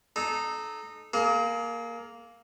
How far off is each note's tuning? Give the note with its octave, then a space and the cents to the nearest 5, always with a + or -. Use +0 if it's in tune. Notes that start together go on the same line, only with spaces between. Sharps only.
D#4 -20 A4 -25
A#3 +0 G#4 +40